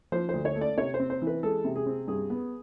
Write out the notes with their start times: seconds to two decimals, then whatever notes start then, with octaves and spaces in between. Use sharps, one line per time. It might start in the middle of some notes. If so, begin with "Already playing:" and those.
0.12 F3 C5
0.29 D2 C5
0.45 C#5
0.56 A3
0.61 D5
0.78 C3 C#5
0.94 C5
1.00 C4
1.10 C5
1.22 E3
1.27 B4
1.43 G#3 A4
1.64 C3
1.76 G#4
1.86 C4
2.08 G2 G#4
2.30 B3